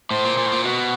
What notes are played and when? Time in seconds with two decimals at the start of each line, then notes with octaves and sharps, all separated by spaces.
0.11 A2 C5
0.24 A#2
0.38 A#2
0.46 A2
0.52 A#2
0.64 B2 F#4